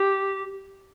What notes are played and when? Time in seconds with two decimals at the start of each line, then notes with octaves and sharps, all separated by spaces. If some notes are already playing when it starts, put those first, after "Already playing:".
Already playing: G4